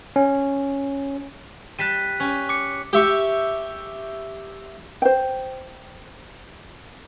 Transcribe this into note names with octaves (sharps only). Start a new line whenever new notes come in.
C#4
G3 A5 F#6 B6 D#7
C#4 G4
D6 C#7
G4 E5 C#6
C5 G5